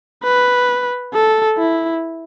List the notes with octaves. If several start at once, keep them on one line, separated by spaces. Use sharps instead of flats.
B4
A4
E4